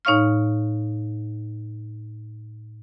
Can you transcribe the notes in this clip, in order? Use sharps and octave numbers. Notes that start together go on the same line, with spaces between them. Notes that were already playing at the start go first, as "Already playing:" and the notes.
A2 D#4 C#5 F5 C#6 F6